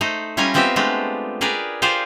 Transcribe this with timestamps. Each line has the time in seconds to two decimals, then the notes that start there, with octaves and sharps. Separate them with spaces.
0.01 A3 D#4 C5
0.37 G3 C#4 E4 F4 G#5 A#5
0.54 B3 C4 F4 G4 D#5 E5
0.76 G#3 A3 D4 F4 G4
1.41 G4 G#4 A#4 B4 D5
1.82 F4 G4 G#4 C5 D5 F5